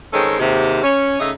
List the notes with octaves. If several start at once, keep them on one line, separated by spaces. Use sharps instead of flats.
D#3 G#3 C4 C#4 A4
D#2 G#2 C3
C#4
C#3 A3 D#4 D#5 E5